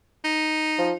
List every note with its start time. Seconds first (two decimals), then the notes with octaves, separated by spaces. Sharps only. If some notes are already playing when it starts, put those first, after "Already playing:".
0.25 D#4
0.79 F3